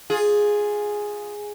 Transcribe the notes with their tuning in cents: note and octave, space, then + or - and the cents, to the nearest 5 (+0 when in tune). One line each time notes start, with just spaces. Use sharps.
F4 +15 G#4 +0